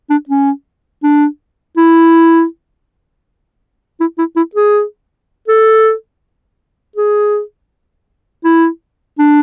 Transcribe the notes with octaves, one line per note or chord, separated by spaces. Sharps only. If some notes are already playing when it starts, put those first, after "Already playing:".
D4
C#4
D4
E4
E4
E4
E4
G#4
A4
G#4
E4
D4